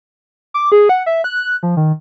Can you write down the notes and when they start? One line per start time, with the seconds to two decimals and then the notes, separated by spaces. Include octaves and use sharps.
0.54 D6
0.72 G#4
0.89 F#5
1.06 E5
1.24 F#6
1.63 F3
1.77 D#3